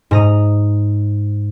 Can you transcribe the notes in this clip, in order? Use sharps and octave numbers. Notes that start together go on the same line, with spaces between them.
G#2 A#5 D#6